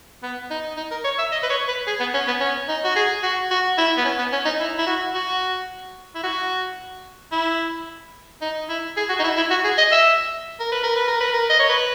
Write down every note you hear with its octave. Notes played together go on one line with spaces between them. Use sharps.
B3
D#4
D#4
A#4
C#5
E5
D#5
B4
C#5
B4
G#4
B3
C#4
B3
C#4
D#4
F#4
G#4
F#4
F#4
E4
B3
C#4
B3
C#4
D#4
E4
E4
F#4
F#4
E4
F#4
E4
D#4
E4
G#4
F#4
D#4
E4
E4
F#4
G#4
D#5
E5
A#4
B4
A#4
B4
A#4
B4
A#4
D#5
C#5
B4